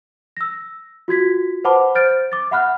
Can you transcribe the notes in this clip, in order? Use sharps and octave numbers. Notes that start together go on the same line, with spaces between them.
E6 A#6
F4 F#4 G#6 B6
B4 C5 F#5 A5 B5 D6
C5 F6 G6 A6 D7
D6 A6
E5 F#5 B5 F6 F#6